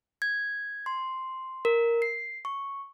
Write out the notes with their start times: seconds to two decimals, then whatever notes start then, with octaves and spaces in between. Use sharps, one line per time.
0.22 G#6
0.86 C6
1.65 A#4
2.02 C7
2.45 C#6